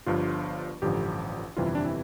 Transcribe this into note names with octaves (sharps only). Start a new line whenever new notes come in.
G1 G2 F3 F4
A1 G2 D3 F3 G4
G1 F2 C3 E3 G3 F4
E4
D4
E4